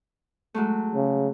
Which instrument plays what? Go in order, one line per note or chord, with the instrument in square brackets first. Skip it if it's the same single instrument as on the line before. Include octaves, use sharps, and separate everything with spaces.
[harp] F#3 G#3 A3
[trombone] C#3